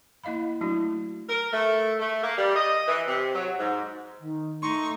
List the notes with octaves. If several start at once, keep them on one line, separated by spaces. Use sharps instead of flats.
A#3 E4 D#5 F5 B5
F#3 A3 D4 E4 F#4
A#4
A3
A3
A#3
G3
D#5
E3
C3
F#3
G#2
D#3
A3 D#4 C6 C#6